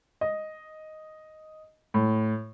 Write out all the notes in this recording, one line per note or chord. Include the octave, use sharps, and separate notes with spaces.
D#5
A2